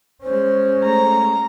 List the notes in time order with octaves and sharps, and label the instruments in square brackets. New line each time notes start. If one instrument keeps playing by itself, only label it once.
[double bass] G#3 C#4 [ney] C5
[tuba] A3 [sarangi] A#5